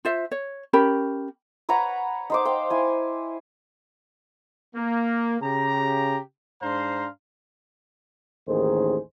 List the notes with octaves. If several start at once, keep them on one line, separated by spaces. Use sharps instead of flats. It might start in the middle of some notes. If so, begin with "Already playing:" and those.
F4 C5 E5
C#5
C#4 G4 A#4 B5
B4 C#5 F#5 A#5
D#4 C5 D6
C5 F5 G5
E4 G#5
A#3
C#3 G4 A#5
G#2 D4 C5 F5 A#5 C6
A1 D#2 D#3 G#4 C5